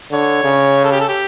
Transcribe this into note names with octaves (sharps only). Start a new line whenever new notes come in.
D3 C#5
C#3
A4
G4
A4
G4